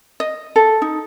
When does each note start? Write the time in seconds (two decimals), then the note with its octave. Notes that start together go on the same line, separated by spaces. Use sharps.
0.20 D#5
0.56 A4
0.82 D#4